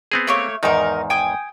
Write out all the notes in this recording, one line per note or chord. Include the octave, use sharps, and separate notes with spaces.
B3 C4 G#4
A3 A#3 C#5
E2 G#2 D#3 D#4 A#4
G5 G#5 D#6